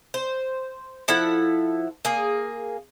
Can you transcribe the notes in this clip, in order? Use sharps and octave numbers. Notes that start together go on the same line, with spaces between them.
C5
F3 E4 A4 F#5
A#3 G#4